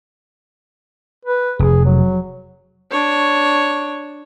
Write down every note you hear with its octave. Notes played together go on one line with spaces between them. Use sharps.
B4
F1 G#4
F#3
D4 C#5